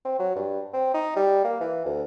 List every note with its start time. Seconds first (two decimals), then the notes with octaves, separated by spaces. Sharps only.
0.05 C4
0.19 F#3
0.36 G2
0.74 C4
0.94 D#4
1.16 G3
1.44 A#3
1.61 E3
1.85 D2